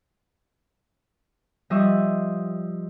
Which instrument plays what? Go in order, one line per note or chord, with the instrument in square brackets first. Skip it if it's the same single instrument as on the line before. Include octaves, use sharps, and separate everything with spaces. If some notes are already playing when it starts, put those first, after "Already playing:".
[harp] F3 G3 D#5 E5 C#6